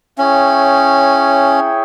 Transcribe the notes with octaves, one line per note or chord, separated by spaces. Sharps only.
C#4 E4 G#4 C#5 E5 G5